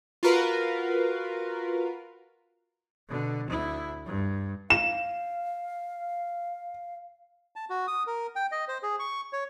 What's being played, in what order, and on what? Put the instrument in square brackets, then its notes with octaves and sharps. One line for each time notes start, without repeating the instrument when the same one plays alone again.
[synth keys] F4 F#4 A#4 B4 F5
[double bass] B2 D3
D2 E4
G2
[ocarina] F5 [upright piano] E7
[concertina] A5
F#4
D#6
A#4
G5
D#5
C5
G#4
C#6
C#5